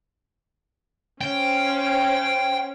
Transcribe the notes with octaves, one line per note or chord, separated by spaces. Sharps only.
C#4 C5 F5 G5